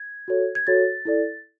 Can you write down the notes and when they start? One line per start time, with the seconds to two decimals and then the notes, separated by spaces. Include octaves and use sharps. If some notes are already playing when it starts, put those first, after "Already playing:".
Already playing: G#6
0.28 F#4 A4 C#5
0.55 G#6
0.67 F#4 A4 C#5 A6
1.05 E4 A4 D5